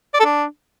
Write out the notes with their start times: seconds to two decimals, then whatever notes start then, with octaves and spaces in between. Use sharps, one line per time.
0.14 D5
0.19 A4
0.25 D4